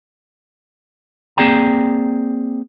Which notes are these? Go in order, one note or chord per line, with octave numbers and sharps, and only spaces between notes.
A#3 C4 G#4 D5 G5 A#5